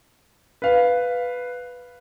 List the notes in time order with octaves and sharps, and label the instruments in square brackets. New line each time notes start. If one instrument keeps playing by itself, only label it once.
[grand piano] B4 F5